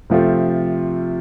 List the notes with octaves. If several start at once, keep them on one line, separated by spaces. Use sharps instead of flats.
C3 F3 A3 C4 F4